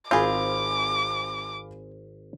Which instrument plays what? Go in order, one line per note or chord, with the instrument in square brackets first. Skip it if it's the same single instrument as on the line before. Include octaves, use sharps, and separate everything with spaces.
[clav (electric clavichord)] G#1 C4 [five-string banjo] F4 G#4 [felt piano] F5 G#5 B5 [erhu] D6